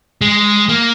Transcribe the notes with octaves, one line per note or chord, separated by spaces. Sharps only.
G#3
A#3